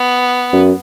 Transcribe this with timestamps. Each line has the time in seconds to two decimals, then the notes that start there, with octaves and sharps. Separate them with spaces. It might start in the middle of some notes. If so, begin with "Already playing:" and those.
Already playing: B3
0.53 F#2